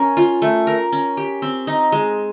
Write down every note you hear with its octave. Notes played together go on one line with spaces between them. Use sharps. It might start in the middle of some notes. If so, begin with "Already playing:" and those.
Already playing: C#4 A#4
F4
A3
A#4
C#4
G4
C4
D#4
G#3